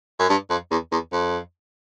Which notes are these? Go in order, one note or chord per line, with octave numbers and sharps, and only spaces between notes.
F#2
G2
F2
E2
E2
F2